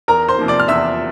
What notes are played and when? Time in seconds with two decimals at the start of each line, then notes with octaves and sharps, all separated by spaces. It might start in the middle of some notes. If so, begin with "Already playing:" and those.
0.08 E2 A#4 A#5
0.28 C5 C6
0.39 C3 F3 A#3
0.48 D5 D6
0.60 F6
0.68 E2 E5 E6